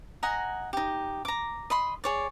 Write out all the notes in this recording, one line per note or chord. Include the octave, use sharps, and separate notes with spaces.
D#5 F#5 G#5 A#5
D#4 G4
A#5 D6
D#5 B5 C6
G#4 C#5 D5